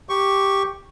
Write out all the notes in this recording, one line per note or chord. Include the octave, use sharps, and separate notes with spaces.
G4 C#6